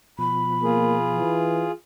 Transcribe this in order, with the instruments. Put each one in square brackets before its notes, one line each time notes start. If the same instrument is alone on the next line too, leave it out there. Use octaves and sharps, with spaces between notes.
[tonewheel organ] B2 F3 [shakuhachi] B5
[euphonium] A#3 [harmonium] F4 G#4
[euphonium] E3